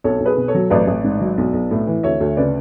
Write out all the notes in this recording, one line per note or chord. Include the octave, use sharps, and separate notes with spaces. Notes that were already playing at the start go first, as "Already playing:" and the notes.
B1 A4 C#5
B1
G#4 B4
B2
A4 C#5
F#3
A1 B4 D5
A1
G#2
F#3
B1
B1
A2
E3
D2 C#5 E5
D2
C#3 B4 D5